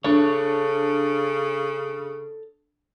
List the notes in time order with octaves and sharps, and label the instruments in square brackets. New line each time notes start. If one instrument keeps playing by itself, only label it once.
[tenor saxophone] C#3 [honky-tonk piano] D4 [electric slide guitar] A4 C#5